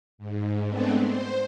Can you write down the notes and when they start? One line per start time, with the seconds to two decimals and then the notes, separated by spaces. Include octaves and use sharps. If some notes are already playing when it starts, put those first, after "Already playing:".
0.18 G#2
0.68 G#3 A3 B3 C4 D4
1.02 C5